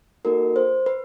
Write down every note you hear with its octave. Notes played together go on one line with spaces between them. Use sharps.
A#3 D#4 F#4 A4 A#4
C5
B4